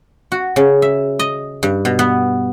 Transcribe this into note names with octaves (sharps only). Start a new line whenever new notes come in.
F#4
C#3
E5
D#5
G2
B2
B3